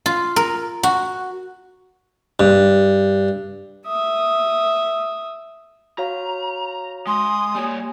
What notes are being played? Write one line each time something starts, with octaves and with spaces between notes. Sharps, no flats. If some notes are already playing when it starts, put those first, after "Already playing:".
F4
A#4
F#4
G2
E5 D#6
F#4 C#5 F5 A#5
G#3 G#5 C6 D#6
G3 A#3 G4 C#5 G#5